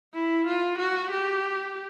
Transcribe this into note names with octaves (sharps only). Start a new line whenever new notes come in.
E4
F4
F#4
G4